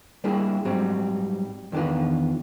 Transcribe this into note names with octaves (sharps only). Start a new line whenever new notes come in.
G3 A#3 D4 E4 G#4
G#2 F#3 G3 C4
E2 D#3 D4 F4 B4